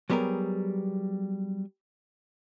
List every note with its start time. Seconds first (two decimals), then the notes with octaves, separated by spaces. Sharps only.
0.10 F#3 G3 B3 G#4 A#4